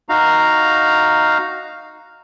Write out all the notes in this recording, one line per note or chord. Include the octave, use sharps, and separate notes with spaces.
D#4 F#4 F5 A#5